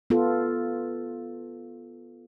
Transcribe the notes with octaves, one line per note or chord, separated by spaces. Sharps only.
B3 F4 A4